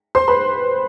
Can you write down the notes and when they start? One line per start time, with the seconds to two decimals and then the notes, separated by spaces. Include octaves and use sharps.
0.15 C5 C6
0.28 B4 B5